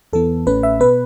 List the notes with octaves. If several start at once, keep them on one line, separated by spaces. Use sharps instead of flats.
E2 E3 B3 A4
A1 A2 A3 C#4 B4
E5
B2 B3 B4